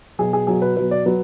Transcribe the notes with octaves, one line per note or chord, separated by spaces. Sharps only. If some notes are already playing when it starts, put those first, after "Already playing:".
B2 F#3 G#4
G#4
B2 F#3 G#4
B4
B2 F#3 B4
D5
F#3 B4